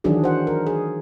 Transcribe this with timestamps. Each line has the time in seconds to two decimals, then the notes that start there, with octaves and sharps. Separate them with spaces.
0.04 D#3 E3 F#3 D4 F#4 G#4
0.24 C5 F#5
0.47 A#4
0.67 G#4